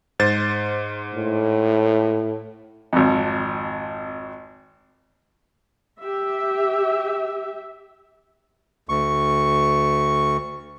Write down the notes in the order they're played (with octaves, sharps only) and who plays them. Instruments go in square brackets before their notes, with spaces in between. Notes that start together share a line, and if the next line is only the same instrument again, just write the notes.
[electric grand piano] G#2 C5 A6
[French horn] A2
[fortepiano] G#1 F2
[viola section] G4 E5
[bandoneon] D2 C#6